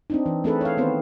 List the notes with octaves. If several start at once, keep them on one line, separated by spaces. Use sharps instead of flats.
C4 D4 D#4
E3
A3 C4 E4 G#4 A4 B4
C#5 F5
D#3 B3 C4 C5